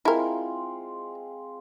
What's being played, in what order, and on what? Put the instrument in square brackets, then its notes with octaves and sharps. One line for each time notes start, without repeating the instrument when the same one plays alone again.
[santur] G#3 C4 F4 [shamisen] E4 A#4